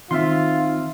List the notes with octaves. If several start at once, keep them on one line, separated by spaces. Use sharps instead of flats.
D#3 C4 F4 E5 F5 C6